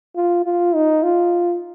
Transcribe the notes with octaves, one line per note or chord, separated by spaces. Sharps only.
F4
F4
D#4
F4